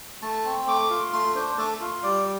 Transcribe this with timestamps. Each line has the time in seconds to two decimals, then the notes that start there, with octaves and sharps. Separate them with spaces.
0.22 A3 A5
0.45 C4
0.67 A3 D6
0.90 F4
1.13 A3 C6
1.35 D4 C5
1.58 A3 A4
1.81 F4
2.03 G3 D5